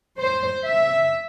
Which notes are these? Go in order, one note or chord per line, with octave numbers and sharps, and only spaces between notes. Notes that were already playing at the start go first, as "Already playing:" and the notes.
C5
E5